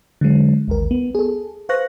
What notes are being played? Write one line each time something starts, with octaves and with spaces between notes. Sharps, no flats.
D3 F#3 G#3
A1 D#2 A#4
B3
G#4 A4
B4 C5 F5 C#6 F#6 A#6